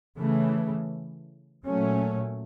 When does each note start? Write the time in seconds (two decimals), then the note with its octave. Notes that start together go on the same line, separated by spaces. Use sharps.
0.18 C#3 E3 A3
1.64 A#2 F#3 A3 C#4